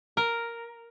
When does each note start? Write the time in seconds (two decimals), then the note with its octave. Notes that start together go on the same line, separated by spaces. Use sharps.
0.17 A#4